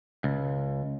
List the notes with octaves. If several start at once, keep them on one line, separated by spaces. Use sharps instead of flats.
C#2